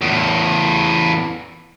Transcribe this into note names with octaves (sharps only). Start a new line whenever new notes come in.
E2 A2